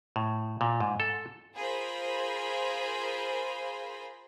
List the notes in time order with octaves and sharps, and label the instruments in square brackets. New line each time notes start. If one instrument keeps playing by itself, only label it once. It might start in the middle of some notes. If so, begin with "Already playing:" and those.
[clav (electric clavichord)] A2
A#2
G#2
A4
[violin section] F4 G#4 A#4 C5 B5